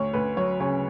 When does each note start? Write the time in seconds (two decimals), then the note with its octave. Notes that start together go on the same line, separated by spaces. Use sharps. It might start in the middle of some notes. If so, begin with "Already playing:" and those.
Already playing: D2 C#5
0.13 D2 B4
0.37 F#3 C#5
0.60 C#3 C#5